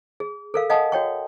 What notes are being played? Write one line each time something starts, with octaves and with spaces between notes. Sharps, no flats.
G#4
A4 A#4 F5
D#5 F5 F#5 G#5 A5 D#6
F#4 C#5 G5 C#6